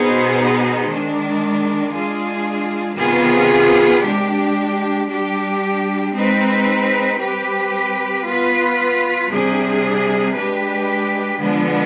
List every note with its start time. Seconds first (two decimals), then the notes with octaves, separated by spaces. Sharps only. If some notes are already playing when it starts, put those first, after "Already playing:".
Already playing: B2 B3 D#4 G#4 C5
0.87 D#3 G#3 D4
1.92 G#3 D4 F4 G#4
2.97 C3 D#3 B3 F4 G#4
4.02 G#3 D4 G4
5.08 G3 D4 G4
6.14 G#3 C4 D#4 B4
7.18 G3 C4 G4 B4
8.23 B3 F4 B4
9.29 C3 G3 D4 G#4
10.35 G#3 D4 G4 B4
11.39 D3 F3 G#3 B3 D4